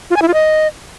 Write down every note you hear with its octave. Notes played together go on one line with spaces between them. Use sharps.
F4
G#5
E4
F4
D#5